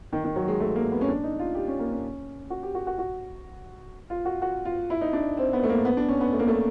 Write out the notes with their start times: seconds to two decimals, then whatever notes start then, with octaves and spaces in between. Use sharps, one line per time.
0.13 D#3
0.24 D#3
0.36 F#3
0.48 G#3
0.60 A3
0.76 A#3
0.92 B3
1.01 C#4
1.08 D4
1.24 D#4
1.39 F4
1.55 G4
1.68 C#4
1.79 A#3
1.92 C#4
2.50 F#4
2.63 G4
2.75 F#4
2.87 F#4
2.98 F#4
4.10 F4
4.25 F#4
4.42 F#4
4.65 F4
4.90 E4
5.01 D#4
5.13 D4
5.37 C4
5.53 B3
5.63 A3
5.69 A#3
5.85 B3
5.97 D4
6.09 C#4
6.21 B3
6.33 A3
6.39 A#3
6.48 A3